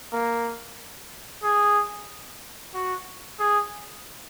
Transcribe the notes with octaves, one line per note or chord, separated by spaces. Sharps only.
A#3
G#4
F#4
G#4